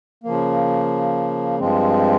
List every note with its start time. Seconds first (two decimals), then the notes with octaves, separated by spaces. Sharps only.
0.24 C#3 F3 A#3
1.59 G2 F3 G#3 C4